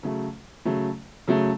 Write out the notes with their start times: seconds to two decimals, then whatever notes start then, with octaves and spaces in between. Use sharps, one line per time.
0.03 C#3 F#3 A3
0.65 C#3 F#3 A3
1.28 C#3 F#3 A3